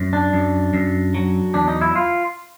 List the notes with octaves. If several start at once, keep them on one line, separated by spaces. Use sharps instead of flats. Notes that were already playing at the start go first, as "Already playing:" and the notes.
Already playing: F#2
D4
F#2
F#2
F#3
E2 D4
D#4
E4
F4